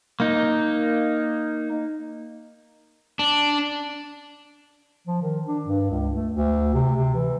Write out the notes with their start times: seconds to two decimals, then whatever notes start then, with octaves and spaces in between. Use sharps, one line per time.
0.20 A#3 D#4
3.19 D4
5.07 F3
5.22 D#3
5.47 D4
5.66 G2
5.90 C#2
6.15 A3
6.32 D2
6.74 C3
6.96 C3
7.14 E3